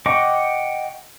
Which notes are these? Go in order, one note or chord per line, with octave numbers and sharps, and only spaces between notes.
D#5 F#5 G5 C#6 D6